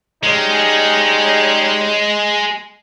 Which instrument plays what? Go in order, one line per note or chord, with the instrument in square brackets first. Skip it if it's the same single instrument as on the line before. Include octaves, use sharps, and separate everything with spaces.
[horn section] G3 C#4 D#4 [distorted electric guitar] G#3